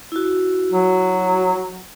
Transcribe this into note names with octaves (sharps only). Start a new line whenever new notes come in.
E4 F#4
F#3